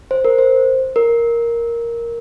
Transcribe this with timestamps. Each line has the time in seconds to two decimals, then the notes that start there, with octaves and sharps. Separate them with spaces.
0.11 C5
0.25 A#4
0.38 C5
0.96 A#4